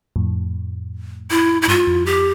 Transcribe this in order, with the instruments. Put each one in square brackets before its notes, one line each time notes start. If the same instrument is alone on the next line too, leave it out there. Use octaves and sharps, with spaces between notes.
[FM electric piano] F2 A2
[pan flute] E4
E4
[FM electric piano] G2 [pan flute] F4
[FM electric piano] F2
[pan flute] G4